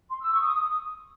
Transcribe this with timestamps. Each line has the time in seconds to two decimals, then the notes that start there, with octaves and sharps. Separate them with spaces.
0.10 C6
0.21 E6
0.31 C#6
0.42 D#6